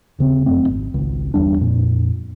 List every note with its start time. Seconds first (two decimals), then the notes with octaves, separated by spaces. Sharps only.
0.19 D#1 C#3 C4
0.46 F1 F#2 A3 C4
0.68 G#1
0.94 G#1 C#2
1.34 G1 E2 G3 D4
1.58 F2 A#2